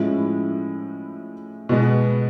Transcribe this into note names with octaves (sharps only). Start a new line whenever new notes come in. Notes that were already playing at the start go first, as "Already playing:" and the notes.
Already playing: A2 F3 G#3 C#4 E4
B2 G#3 B3